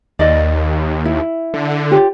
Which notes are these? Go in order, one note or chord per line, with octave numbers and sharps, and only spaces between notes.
D#2 D5 D#5
E4
D3
F4 G4 C#5